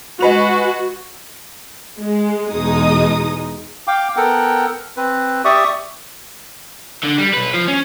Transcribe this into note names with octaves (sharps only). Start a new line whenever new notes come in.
G#3 F#4 B4 F7
G#3
E2 B2 G#3 D#4 D#6
F5 G5 D6
B3 A4 A#4 F#5 G5
C4 B4
G4 D5 E5 C#6 D#6
D3
G3
B1 B4
F3
C#4